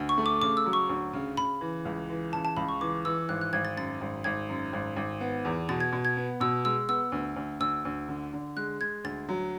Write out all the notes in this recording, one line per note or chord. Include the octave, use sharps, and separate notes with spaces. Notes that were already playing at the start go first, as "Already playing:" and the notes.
Already playing: D2
C#6
A3
D6
C#3 D6
E6
F#3
C#6
D2
C#3
C#3 B5
E3
C#2
E3
C#3 A5
A5
C#2 B5
C#6
E3 D6
E3 E6
G#1 F#6
F#6
G#1 G#6
A6
F#2 A6
G#1
G#1 G#6
F#2
G#1
G#1
B3
E2
B2 A6
G#6
B2
G#6
B3
B2 E6
G#3 E6
B3 E6
D2
D2
D2 E6
D2
D3
D3
G#3 F#6
G#3 G#6
D2 A6
F#3